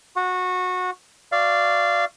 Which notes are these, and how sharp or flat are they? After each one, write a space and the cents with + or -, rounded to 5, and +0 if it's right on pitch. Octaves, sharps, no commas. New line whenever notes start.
F#4 -20 F#5 -20
F#4 -10 D5 +0 F5 -20